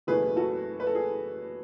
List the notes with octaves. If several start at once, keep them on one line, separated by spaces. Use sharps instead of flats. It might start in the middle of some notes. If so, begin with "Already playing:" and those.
F#1 E2 B2 F#3 A3 G#4 B4
F#4 A4
B4
A4
G#4